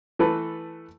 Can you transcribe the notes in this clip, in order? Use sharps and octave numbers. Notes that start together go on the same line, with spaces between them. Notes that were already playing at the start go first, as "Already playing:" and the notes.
E3 A3 A4 B4